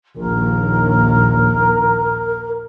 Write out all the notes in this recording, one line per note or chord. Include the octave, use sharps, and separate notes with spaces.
A#1 D#2 A#4